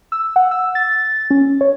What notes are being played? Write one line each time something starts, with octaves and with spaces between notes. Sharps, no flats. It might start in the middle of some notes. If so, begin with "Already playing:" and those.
E6
F#5
E6
A6
C#4
C#5